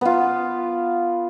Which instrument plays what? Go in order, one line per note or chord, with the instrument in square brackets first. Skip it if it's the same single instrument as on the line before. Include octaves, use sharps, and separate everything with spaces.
[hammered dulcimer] B3 F4